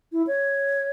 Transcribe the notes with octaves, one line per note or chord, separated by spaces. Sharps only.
E4
C#5